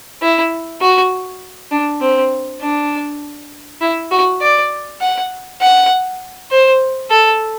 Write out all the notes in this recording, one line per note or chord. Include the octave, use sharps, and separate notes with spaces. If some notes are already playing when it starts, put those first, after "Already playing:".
E4
F#4
D4
C4
D4
E4
F#4
D5
F#5
F#5
C5
A4